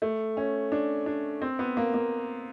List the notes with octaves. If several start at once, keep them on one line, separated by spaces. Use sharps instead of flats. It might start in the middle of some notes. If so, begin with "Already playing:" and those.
A3
C#4
D4
D4
C4
B3
A#3
A#3